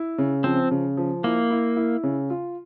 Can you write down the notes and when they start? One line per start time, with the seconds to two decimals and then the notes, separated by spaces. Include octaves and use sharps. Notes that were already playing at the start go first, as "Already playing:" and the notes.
Already playing: E4
0.18 C#3
0.44 F3 C4
0.71 C#3
0.97 F3
1.24 A#3 E4
1.50 E4
1.76 E4
2.03 C#3
2.30 F4